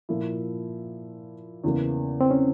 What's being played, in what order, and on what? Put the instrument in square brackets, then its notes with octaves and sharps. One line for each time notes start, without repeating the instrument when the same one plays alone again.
[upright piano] A#2 F3 A#3 E4
E2 C#3 E3 A#3
[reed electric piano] C4
C#4